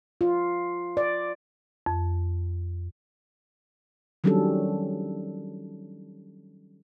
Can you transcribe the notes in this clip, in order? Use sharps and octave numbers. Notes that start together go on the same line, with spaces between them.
F4
D5
F2
D#3 F#3 G3 C#4 D4 A4